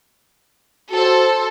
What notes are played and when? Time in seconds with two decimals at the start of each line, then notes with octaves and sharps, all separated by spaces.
0.92 F#4 A4 C5